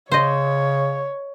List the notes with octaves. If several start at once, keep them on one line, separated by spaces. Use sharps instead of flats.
C#3 C5 C#5 D#5